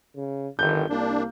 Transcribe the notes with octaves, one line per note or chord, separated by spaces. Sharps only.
C#3
G1 D#3 G6
C2 A#3 D4